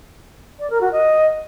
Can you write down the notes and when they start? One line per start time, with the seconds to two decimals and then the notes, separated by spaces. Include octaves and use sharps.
0.59 D5
0.69 A#4
0.80 F#4
0.91 D#5